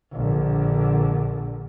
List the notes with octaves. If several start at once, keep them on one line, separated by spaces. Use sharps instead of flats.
A#1 D3